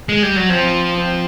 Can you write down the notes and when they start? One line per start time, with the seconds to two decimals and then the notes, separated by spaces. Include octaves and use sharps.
0.09 G#3
0.23 G3
0.37 F#3
0.50 F3 C4
0.96 C4